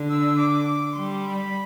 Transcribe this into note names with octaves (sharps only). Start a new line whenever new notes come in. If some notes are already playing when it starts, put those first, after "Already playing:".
Already playing: D3
E6
D6
D6
G3 C6
B5